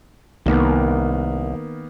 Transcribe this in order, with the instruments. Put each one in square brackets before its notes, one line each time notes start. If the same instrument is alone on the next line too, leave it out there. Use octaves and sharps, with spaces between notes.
[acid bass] C2 [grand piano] D#3 A#3 B3